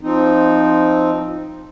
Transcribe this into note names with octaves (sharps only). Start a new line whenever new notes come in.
F3 C4 D#4